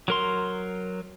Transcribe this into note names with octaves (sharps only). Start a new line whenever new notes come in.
F#3 A#4 C6